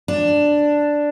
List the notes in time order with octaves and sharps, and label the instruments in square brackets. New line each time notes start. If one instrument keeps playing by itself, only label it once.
[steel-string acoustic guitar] D4